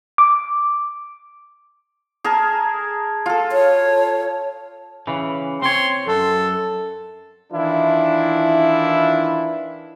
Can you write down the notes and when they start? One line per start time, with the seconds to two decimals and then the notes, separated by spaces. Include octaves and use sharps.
0.18 D6
2.24 G#4 A#4 A5
3.26 F4 A4
3.52 C#5
5.07 C#3 E3
5.62 C4 C#5 C6
6.07 F#2 A4
7.52 D#3 E3 D4 E4 F4